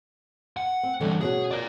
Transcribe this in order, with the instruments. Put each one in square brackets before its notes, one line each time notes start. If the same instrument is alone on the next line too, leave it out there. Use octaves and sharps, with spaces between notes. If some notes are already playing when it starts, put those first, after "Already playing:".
[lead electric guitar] F#5
[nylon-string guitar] C4
[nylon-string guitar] D3 A3 [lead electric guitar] E3 G3
[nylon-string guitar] B2 C#4 F#4 [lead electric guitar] G#4
[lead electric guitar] A#4 D5